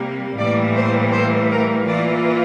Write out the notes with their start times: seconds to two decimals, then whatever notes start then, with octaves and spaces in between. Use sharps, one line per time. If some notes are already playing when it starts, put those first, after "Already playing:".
Already playing: C3 G3 A#3
0.37 A2 E3 G3 A#3 D5
0.75 C5
1.12 C5
1.50 A#4
1.87 E3 A#3 F4 D5